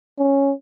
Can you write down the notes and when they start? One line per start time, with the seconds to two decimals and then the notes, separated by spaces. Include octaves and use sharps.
0.19 C#4